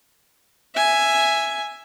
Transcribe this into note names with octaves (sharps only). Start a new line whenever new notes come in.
E5 G#5